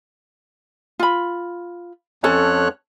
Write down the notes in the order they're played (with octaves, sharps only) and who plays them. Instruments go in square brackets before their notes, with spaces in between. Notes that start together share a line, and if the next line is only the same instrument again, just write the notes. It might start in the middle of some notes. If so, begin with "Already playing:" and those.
[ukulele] F4 B5
[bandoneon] F2 C#5 F#6 [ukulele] C#4 A4 A5